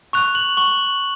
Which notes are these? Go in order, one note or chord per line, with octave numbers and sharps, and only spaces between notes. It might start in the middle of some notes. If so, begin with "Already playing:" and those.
C#6 F#6 F7
F#7
C#6 F#7